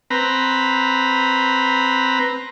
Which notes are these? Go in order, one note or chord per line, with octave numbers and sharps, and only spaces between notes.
C4 B4 A#5